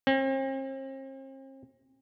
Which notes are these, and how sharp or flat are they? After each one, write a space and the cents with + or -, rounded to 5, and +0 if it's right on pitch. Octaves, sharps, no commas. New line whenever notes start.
C4 +45